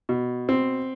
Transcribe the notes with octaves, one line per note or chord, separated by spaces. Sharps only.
B2
C4